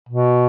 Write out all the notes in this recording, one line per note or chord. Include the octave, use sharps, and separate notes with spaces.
B2